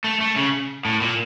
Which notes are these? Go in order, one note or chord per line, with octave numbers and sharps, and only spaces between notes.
A3
A3
C#3
A2
A#2